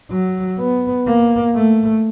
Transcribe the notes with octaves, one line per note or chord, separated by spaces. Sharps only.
F#3
B3
A#3
A3